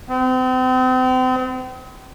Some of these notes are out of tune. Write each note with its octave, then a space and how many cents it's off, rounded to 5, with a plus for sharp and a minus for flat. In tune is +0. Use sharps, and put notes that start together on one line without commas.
C4 -40